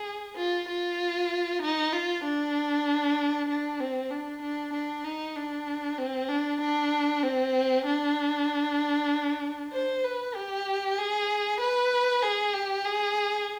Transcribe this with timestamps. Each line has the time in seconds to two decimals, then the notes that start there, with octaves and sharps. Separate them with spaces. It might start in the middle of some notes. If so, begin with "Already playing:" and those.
Already playing: G#4
0.36 F4
0.69 F4
1.62 D#4
1.93 F4
2.24 D4
3.49 D4
3.80 C4
4.11 D4
4.42 D4
4.73 D4
5.05 D#4
5.36 D4
5.98 C4
6.29 D4
6.61 D4
7.23 C4
7.86 D4
9.73 C5
10.04 B4
10.35 G4
10.98 G#4
11.60 B4
12.23 G#4
12.53 G4
12.85 G#4